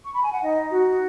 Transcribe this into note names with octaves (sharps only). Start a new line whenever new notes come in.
C#6
B5
G#5
F#5
D#4 D#5
F#4